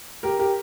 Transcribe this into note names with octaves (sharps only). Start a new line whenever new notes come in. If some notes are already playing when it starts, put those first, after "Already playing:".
G4 A#4
G4 A#4